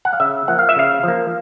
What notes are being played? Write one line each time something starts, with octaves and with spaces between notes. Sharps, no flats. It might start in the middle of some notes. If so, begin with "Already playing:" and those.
F#5
F5
C#3 E5
F3 A#3 F#5
F5
E5
C#3 F5
F3 A#3